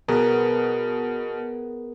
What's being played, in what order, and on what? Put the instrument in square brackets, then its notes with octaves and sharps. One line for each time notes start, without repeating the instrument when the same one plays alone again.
[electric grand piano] B2 [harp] B3 [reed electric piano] G#4 A#4